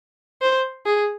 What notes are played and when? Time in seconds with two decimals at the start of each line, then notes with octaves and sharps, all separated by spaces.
0.42 C5
0.86 G#4